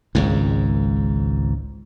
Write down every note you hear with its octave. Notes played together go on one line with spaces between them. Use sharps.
G#1 C#2 G#2